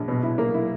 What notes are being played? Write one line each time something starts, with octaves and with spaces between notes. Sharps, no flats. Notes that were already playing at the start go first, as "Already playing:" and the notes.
Already playing: A#1
B2
E4
A#3
E4